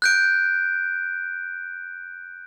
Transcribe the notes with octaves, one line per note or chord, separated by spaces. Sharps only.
F#6 G6 D7